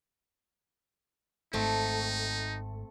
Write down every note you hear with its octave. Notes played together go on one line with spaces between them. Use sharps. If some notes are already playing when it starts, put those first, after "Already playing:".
G#1 G#2 A3 C4 D#4